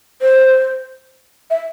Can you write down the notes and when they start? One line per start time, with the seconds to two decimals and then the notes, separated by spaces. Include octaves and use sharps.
0.22 C5
1.50 E5